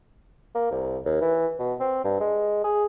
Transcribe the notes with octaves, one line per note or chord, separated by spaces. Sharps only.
A#3
C2
D#2
E3
B2
C4
G2
G#3
G#4